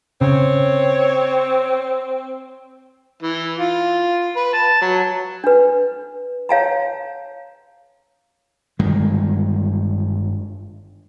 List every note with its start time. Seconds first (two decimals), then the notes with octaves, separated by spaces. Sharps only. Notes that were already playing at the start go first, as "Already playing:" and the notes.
0.21 C#3 C4 C#5
3.22 E3
3.59 F4
4.36 B4
4.54 A5
4.81 F#3
5.44 D4 B4
6.49 C#5 F5 A5 A#5
8.79 G1 G2 D#3 G#3